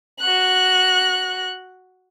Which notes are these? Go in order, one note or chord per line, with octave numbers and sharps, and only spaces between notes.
F#4 F#6